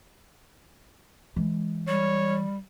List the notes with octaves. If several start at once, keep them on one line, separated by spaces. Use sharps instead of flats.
E3 G#3
G3 C#5